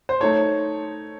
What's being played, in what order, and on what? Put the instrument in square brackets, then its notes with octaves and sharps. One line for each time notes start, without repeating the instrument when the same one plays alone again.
[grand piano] C5
[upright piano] A3 D#4 A4 [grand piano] C#5